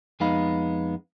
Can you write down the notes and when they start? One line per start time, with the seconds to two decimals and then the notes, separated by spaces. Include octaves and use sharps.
0.20 F2 G#3 B3 D#4 F5 B5